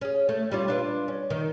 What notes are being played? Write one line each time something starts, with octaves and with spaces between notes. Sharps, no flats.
C#4 G#4
A3
G3 C#4 F4
D4 F4 B4
C#4
D#3